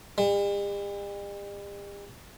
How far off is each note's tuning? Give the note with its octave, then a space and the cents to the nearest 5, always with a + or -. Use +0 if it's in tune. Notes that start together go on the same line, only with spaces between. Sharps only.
G3 +45